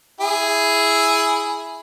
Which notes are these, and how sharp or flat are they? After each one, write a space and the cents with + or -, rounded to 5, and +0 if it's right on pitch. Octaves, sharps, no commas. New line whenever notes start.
E4 +0 G#4 +0